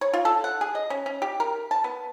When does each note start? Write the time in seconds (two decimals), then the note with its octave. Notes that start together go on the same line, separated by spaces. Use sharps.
0.01 C#5
0.13 F4
0.25 A4
0.44 F#5
0.61 G#4
0.75 D#5
0.90 C#4
1.06 C#4
1.22 G4
1.40 A#4
1.71 A5
1.84 B3